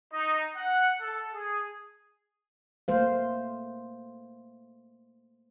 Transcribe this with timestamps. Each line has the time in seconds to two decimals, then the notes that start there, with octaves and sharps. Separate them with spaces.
0.13 D#4
0.55 F#5
1.00 A4
1.34 G#4
2.88 A3 A#3 C5 F5